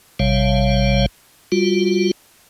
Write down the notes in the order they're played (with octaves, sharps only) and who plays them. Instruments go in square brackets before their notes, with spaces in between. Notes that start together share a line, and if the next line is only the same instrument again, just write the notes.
[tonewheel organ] A1 C3 G3 C#5 F5
G3 F4 F#4